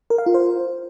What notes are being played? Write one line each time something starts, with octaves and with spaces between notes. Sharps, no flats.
A#4
F5
F4
C5